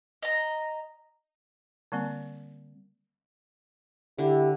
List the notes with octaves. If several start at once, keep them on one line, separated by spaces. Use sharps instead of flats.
D#5 A#5
D3 G3 A#3 C4
D3 E4 G4